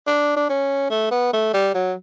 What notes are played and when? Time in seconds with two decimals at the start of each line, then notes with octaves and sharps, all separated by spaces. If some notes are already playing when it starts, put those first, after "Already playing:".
0.07 D4
0.37 D4
0.49 C#4
0.90 A3
1.11 B3
1.33 A3
1.54 G3
1.74 F#3